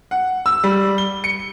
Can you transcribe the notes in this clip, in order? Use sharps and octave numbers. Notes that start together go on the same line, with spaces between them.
F#5
E6
G3
G7
C#7